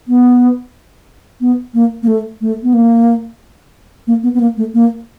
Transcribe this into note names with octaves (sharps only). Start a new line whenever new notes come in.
B3
B3
A#3
A#3
A3
A3
B3
A#3
A#3
B3
B3
A#3
A3
A#3